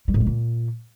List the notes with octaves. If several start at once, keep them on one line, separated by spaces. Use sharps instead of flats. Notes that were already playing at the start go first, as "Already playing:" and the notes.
G3
A2
G#3
A#2